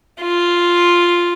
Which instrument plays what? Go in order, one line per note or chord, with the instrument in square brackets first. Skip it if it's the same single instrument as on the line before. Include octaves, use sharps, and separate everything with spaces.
[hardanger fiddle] F4